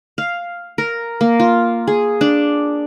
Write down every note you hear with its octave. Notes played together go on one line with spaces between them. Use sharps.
F5
A#4
A#3
F4
G#4
D4